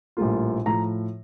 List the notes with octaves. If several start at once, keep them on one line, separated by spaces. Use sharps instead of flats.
A#1 A2 G3 A#3 F4
A2 F3 A#5